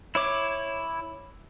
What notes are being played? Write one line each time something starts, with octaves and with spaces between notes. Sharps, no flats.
E4 C#5 D6